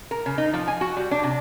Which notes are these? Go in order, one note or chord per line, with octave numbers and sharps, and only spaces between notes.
A#4
C#3
D#4
F3
G#5
F#4
G3
D4
C3